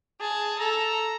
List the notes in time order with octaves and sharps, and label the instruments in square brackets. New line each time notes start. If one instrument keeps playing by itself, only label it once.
[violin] G#4 [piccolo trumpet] A5
[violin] A4 [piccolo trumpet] A#5